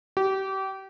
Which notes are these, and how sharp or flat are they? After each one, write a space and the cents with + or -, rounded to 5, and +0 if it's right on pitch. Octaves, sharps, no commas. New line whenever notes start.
G4 -30